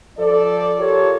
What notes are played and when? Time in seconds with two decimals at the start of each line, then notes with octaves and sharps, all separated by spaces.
0.17 F3 A4 D5
0.78 F4 G4 A4 A#4 C#5